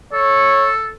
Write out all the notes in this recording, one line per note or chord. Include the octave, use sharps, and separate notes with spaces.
A4 C#5